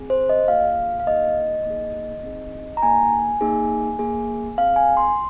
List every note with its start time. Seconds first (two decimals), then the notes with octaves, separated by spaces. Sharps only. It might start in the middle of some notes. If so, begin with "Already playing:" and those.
Already playing: C4 G#4
0.10 C5
0.29 D#5
0.48 A#3 F4 G#4 F5
1.00 F5
1.07 A#3 D#4 G#4 D#5
1.65 A#3 D#4 G#4
2.24 C4 D#4 G#4
2.77 A#5
2.83 A#3 D#4 G#4 G#5
3.41 A#3 D#4 G#4
3.99 A#3 G#4
4.58 C4 G#4 F5
4.76 G#5
4.97 C6